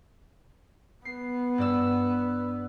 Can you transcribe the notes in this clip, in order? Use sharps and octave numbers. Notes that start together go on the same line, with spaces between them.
B3 C7
G2 D5 E6